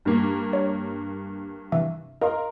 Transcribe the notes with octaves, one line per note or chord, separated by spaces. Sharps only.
G2 A#3
C#5
C3 E3 E5
A#4 D#5 F5 C6